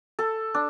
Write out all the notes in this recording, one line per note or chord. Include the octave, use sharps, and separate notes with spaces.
A4
D4